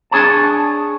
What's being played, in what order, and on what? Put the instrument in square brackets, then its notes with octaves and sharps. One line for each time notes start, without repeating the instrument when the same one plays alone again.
[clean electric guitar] D4 G#4 C#5 A5